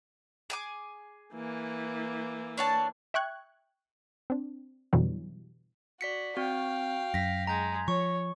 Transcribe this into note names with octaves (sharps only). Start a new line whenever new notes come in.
G#4 G#5 D6
E3 A#3
D4 C#5 A5
E5 G5 C#6 F#6 G#6
C4 D4
F2 B2 D3 E3 F#3 G3
F#4 D5 B6 C#7
C4 F#4 F5 G5
F#2 A#6 B6
G#3 A#5 G6
F3 C#5 C#6